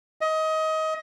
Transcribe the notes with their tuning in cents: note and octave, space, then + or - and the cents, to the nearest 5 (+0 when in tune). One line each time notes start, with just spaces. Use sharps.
D#5 +25